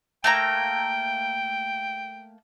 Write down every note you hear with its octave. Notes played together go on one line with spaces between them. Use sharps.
A3 A#3 G5 A#5